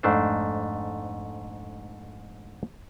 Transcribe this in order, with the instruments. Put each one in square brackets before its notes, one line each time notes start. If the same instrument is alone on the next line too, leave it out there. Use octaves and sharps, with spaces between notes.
[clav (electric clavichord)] F2 G#2 A3 D4 C5